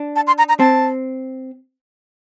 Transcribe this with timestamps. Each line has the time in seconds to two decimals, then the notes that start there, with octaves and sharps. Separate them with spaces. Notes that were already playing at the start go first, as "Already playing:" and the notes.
Already playing: D4
0.16 A5
0.27 C6
0.38 A#5
0.49 A#5
0.59 C4 A5